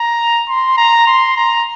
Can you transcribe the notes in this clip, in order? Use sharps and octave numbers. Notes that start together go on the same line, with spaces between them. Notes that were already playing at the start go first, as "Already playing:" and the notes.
Already playing: A#5
C6
A#5
C6
A#5